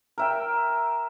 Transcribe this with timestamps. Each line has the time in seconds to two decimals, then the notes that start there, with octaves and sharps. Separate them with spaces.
0.18 A#4 E5 G5